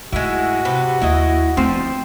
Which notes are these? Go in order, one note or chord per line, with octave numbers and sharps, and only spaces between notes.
G#2 G#3 A3 E4 F#4
C3 B4
D#2 E4 D#5
F3 A3 C4